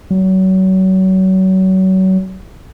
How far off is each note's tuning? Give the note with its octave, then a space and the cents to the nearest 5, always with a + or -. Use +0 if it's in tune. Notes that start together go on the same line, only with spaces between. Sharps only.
F#3 +30